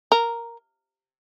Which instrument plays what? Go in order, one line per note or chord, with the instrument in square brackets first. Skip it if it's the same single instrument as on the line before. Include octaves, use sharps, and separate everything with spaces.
[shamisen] A#4